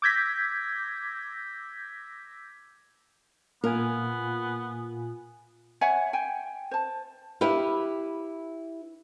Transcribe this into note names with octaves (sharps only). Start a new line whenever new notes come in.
D6 E6 G6 G#6 A#6 B6
A#2 B3 F4 A#4 G#5
C#5 E5 F#5 G#5
G5 G#5
C5 A5
E4 G4 B4 F5